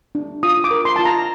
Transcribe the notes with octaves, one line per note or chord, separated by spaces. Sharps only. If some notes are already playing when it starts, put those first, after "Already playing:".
D4
F4 D#6
D6
A#4
C6
F4 A5
A#5